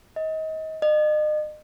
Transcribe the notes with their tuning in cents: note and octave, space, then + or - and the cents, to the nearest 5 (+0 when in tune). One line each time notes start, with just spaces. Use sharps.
D#5 +30
D#5 -40